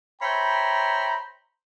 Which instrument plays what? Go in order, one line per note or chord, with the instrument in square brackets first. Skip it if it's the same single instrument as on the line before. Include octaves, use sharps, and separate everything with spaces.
[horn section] C5 C#5 E5 G5 A#5 B5